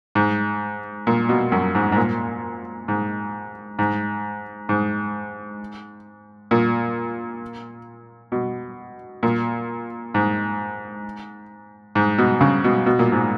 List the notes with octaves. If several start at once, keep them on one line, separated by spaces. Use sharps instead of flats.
G#2
A#2
B2
F#2
G#2
G#2
A#2
G#2
G#2
G#2
A#2
B2
A#2
G#2
G#2
B2
C#3
B2
B2
A#2
G#2